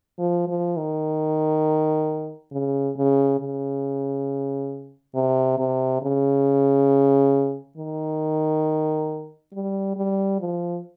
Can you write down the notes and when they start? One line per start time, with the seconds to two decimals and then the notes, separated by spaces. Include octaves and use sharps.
0.18 F3
0.48 F3
0.77 D#3
2.52 C#3
2.96 C#3
3.39 C#3
5.15 C3
5.58 C3
6.02 C#3
7.77 D#3
9.53 G3
9.96 G3
10.40 F3